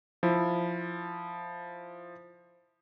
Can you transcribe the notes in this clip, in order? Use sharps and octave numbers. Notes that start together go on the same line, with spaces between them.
F3 E4